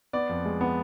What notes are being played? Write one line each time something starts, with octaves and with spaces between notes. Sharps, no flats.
B3 D5
F2
G#3
B3